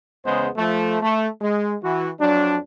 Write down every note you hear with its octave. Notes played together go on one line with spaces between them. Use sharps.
E2 C#3 G#3 B3 C5
F3 A3
A3
G#3
E3 F#4
F2 F#3 D4